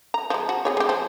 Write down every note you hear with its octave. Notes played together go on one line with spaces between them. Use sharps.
A#5
F3 G#3
F#4
C4 G#4 C#5
G#3 G4
F3 C5